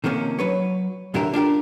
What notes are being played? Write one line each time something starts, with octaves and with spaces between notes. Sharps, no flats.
C3 D#3 F3 A#3 C#4
F#3 B4 C#5
C2 F#2 D3 G4 A#4 E5
D4 F4 G4 A#4